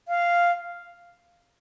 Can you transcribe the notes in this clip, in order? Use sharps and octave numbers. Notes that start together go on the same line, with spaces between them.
F5